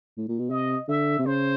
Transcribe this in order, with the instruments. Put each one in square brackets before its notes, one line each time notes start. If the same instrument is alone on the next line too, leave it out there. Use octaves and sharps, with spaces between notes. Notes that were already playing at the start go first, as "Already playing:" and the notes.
[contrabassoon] A2
A#2
B2
[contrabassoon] C3 [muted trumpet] D#5
[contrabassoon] D3 [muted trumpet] E5
[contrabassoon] C3
[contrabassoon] C#3 [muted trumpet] C5